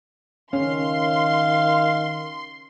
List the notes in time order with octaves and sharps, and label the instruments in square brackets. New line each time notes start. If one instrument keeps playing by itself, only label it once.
[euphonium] D#3 [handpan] C#4 [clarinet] F5 [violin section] C6